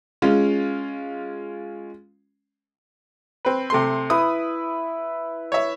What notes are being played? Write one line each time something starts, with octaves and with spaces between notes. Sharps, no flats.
G#3 C#4 F4
C4 B4
C3 A3 C6
E4 B4 D#6
C#5 E5